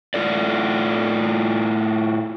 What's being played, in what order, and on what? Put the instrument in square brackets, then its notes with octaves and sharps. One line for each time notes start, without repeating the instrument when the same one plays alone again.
[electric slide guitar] A2 F4 A4 D5